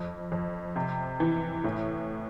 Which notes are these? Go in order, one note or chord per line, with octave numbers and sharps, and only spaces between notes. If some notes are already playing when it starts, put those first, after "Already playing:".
Already playing: F2
F2
C3
E3
A2